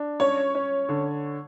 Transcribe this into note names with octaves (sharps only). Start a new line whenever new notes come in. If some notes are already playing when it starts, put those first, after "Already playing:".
Already playing: D4
C#4 C#5
C#4
D3